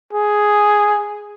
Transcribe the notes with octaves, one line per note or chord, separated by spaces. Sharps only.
G#4